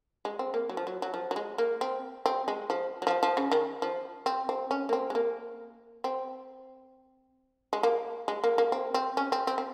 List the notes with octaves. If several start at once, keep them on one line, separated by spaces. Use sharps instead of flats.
G#3
C4
A#3
F#3
F3
F#3
F#3
F3
F#3
G#3
A#3
C4
C4
G#3
F3
F#3
F3
F3
C#3
D#3
F3
C4
C4
C#4
A#3
C4
G#3
A#3
C4
G#3
A#3
G#3
A#3
A#3
C4
C4
C#4
C4
C4
C4